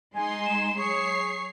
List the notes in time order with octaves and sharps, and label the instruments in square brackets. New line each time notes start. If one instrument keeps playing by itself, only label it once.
[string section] G#3 D#4 C6 [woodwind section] G#5
[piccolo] E7
[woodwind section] F#3 G#4 [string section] C#5 C7 [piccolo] C#6